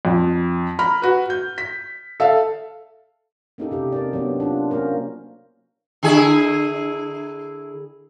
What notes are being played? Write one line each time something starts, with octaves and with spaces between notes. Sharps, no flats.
F2
A#5 B5 F6
F#4 B4
G6
B6
A4 E5 F5
A#3 C#4 D#4 E4 G4 A4
C3 G4
C4 A#4 D5
F#3 B3 D4
D4 F4
A#3 C#4 D4 F#4 A#4 C5
D3 E4 G#4